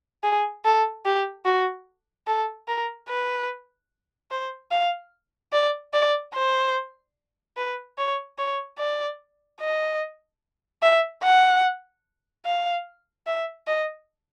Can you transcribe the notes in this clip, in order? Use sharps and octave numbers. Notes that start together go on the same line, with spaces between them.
G#4
A4
G4
F#4
A4
A#4
B4
C5
F5
D5
D5
C5
B4
C#5
C#5
D5
D#5
E5
F#5
F5
E5
D#5